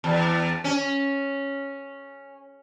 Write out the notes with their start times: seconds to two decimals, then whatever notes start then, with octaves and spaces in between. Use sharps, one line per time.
0.04 E2
0.64 C#4